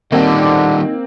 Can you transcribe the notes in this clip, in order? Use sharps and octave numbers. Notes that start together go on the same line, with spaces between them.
D3 D#3 G3 A#3 C4 D#4